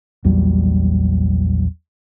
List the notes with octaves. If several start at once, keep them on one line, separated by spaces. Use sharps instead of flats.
A#1 E2 F#3 G3